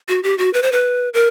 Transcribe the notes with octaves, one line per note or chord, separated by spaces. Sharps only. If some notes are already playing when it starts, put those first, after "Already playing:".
F#4
G4
F#4
B4
C5
B4
A#4